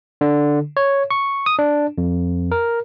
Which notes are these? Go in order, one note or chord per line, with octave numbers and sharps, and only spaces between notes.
D3
C#5
C#6
D#6
D4
F2
A#4